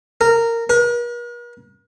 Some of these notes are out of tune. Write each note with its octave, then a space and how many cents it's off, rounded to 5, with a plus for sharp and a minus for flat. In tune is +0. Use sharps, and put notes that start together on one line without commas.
A#4 -15
A#4 +45